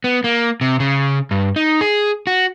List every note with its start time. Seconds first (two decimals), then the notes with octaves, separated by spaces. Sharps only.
0.04 B3
0.24 A#3
0.61 C3
0.80 C#3
1.31 G2
1.56 D#4
1.81 G#4
2.27 F#4